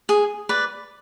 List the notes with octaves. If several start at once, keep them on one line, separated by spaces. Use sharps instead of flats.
G#4
B4 D5